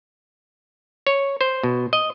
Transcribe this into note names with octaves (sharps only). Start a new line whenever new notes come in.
C#5
C5
B2
D#5